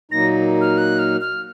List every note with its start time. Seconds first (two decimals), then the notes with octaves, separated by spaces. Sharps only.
0.11 A#2 F#3 A#3 D#4 A#6
0.61 F6
0.78 F#6
0.99 F6
1.21 F6